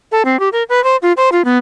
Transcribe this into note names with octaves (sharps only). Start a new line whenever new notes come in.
A4
C4
G4
A#4
B4
C5
F4
C5
F4
B3